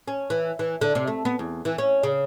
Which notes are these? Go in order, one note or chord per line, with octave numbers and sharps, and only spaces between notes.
C#4
E3
E3
D3
C3
A3
B3
E2
E3
C#4
C#3